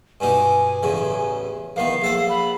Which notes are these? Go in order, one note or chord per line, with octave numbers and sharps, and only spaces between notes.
G2 B2 D#4 G#5
A1 E2 C#3
E2 D#3 B3 F5
A#1 A4 F#5
B5